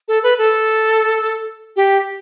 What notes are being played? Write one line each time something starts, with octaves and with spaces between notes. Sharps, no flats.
A4
B4
A4
G4